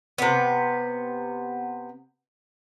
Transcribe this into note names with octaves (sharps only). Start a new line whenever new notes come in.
C3 B3